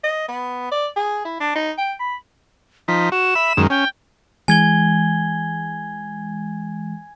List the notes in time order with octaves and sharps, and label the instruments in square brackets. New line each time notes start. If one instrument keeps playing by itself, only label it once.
[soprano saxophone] D#5
B3
D5
G#4
E4
D4
D#4
G5
B5
[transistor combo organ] F3 D#4 [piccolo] B6
[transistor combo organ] F#4 [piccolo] E7
[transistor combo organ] E5 B5
F#2 D#3 G#3
[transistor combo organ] C#4 [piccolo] G5
[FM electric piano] E3 G#3 [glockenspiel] G#5 G#6 G7